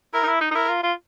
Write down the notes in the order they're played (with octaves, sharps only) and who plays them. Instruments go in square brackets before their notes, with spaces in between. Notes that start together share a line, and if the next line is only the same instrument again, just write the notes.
[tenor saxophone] E4 [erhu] A#4
[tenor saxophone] D#4
E4
D#4
D#4
[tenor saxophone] E4 [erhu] A#4
[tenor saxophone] F4
F4